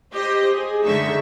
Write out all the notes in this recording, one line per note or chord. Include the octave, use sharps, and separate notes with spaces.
G4 C5 D#5
G#4
F#2 D3 G#3 D#4 E5 C#6